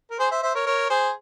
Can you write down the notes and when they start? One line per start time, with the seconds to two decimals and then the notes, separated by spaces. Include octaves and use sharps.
0.11 A#4
0.19 G#4 C5
0.31 C5 E5
0.43 C5 E5
0.55 A#4 C#5
0.66 A#4 C#5
0.90 G#4 C5